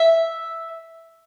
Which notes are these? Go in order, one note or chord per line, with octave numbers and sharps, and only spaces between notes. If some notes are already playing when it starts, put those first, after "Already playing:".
Already playing: E5